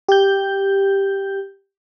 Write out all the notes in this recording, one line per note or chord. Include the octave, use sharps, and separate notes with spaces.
G4 G6